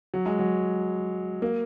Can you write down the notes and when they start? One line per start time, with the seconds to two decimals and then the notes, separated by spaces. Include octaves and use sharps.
0.14 F#3
0.26 G#3
0.39 F#3
1.42 A#3